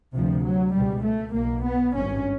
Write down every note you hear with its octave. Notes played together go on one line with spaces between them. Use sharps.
D2 C3 F3
F#3
C#2 B2 G3
A3
B1 B2 A#3
B3
G#1 G2 C#4